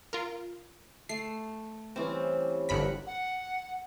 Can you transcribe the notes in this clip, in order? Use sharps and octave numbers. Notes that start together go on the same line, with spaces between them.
F4 A#4
A3 C7
C3 E3 G3 C4 C#4
G1 A#4 F#5 B5 B6
F#5